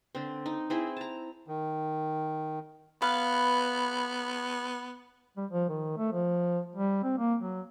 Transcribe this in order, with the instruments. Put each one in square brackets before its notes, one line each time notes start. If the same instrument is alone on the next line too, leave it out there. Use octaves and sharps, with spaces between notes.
[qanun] D3 C4
D#4
C4 E4 G#4
A5 A#5
[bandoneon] D#3
[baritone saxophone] B3 [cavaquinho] B4 F5
[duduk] G3
F3
D#3
A3
F3
G3
C4
A#3
F#3